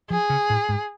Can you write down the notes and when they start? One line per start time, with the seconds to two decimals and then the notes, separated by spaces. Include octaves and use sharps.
0.10 F3 G#4
0.30 C#3
0.50 A2
0.69 G#2